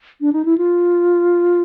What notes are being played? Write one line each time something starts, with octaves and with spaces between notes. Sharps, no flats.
D4
D#4
E4
F4